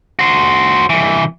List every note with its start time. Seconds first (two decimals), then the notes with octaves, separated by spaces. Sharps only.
0.19 F#4 C5
0.90 C2 E3